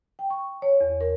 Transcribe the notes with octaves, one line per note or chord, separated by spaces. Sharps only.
G5
C#6
C#5
E2
A#4